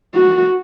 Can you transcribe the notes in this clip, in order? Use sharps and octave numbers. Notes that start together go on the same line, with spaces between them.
F#4